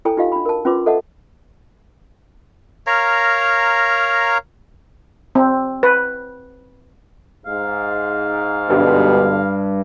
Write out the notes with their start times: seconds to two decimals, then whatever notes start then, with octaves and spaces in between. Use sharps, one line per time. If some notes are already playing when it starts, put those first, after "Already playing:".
0.05 E4 A4 C#5 G5 G#5 A#5
0.17 D#4 F4 G4 D#5 F5
0.32 D4 B5
0.45 A#4 A5
0.65 C#4 F4 B4 C6 D6
0.86 A4 C#5 D#5 E5 F#5 A5
2.87 A#4 C#5 F5 A#5
5.35 C4
5.83 B4
7.46 G#2 F5
8.70 G2 B2 D3 G4